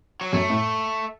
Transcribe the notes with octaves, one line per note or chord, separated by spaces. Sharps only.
F#3
F#2 A3
A2